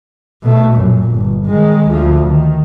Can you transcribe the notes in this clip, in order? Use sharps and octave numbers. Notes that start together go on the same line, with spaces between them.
B2 A3
F#2 A#2
G1
D#3 G#3
D2 F3
D#3